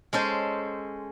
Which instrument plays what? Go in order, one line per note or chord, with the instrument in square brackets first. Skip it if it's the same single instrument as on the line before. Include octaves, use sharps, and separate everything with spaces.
[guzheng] G#3 C#4 A4 C5